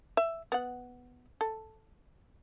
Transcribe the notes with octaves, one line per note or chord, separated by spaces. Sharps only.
E5
B3 F#5
A4